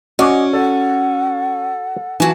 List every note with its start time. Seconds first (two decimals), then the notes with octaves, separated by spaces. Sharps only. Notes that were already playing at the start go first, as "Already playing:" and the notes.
0.19 C#4 F#4 D5 D#5 G#5 D6
0.53 A4 F#5
2.20 E3 F#4 G#5 A5